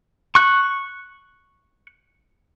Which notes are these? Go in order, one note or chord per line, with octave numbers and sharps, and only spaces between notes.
C#6 F#6